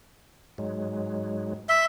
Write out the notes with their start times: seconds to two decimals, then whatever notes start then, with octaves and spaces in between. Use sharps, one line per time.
0.58 G#2 F#3 G#3
1.69 E5 C6